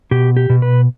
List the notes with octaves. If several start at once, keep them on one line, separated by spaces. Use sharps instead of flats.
B2 G4
G4
B2
B4